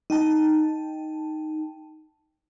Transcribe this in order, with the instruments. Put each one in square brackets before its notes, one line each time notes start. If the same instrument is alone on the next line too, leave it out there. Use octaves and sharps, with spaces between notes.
[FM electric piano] D#4 G5 A5